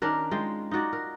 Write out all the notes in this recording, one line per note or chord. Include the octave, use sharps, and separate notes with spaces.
D#3 C#4 D4 A#4
G#3 F4 G5
D#4 F4 F#4 D5
A#4